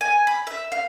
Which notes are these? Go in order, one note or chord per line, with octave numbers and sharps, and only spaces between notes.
G#5
B5
E5
F5